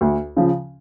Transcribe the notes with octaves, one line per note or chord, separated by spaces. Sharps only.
D2
C#3 F3